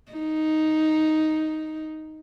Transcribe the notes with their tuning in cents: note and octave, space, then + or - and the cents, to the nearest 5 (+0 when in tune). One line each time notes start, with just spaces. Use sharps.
D#4 +5